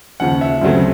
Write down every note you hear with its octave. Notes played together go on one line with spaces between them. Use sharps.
D#2 C#3 F3 F#5
E5
D2 C#3 F#3 A3 C4